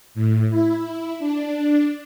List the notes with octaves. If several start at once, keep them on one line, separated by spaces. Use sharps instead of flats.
A2
E4
D4